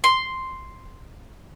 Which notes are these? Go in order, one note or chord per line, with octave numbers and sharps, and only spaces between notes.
C6